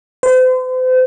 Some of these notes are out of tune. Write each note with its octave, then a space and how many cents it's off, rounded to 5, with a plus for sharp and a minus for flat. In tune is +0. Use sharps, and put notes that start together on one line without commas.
C5 -40